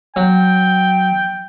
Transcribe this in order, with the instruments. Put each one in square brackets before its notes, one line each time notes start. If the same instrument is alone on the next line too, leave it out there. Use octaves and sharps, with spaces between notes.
[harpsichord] F#3 [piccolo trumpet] G5